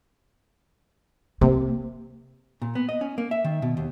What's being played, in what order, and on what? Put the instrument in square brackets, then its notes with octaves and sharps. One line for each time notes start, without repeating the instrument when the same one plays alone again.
[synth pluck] C3 [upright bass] A#3
[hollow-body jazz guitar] A#2
B3
D#5
C#4
A#3
E5
D#3
B2
D#2